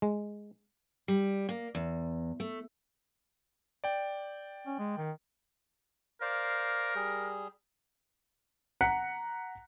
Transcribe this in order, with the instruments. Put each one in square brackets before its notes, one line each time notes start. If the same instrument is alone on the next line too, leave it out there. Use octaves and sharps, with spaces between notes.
[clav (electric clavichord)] G#3
[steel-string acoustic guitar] G3
A#3
E2
A3
[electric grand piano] D5 G5
[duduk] C#4
G#3
D#3
[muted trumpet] A#4 [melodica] C5 D5 F5
[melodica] G3 G#4
[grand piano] F#5 A#5 F#6 B6 C#7